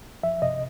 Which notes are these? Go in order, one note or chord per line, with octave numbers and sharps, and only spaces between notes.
F3 E5
C3 D#5